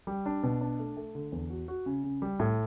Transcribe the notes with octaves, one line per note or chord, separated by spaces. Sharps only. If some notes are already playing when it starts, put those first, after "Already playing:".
G3
D4
B2
D4
A3
A3
D3
E2
F#4
F#4
C#3
C#3
G3
A2